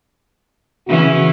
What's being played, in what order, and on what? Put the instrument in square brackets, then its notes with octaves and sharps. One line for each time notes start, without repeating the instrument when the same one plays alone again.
[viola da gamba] C#3 E3 C#4 [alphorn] F#4